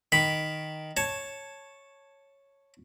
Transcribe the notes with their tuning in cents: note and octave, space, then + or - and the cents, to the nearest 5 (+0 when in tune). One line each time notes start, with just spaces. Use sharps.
D#3 +0 B5 +0
C#5 -5 A5 +0